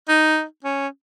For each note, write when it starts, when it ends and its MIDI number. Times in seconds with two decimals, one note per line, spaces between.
0.09 0.43 63
0.64 0.87 61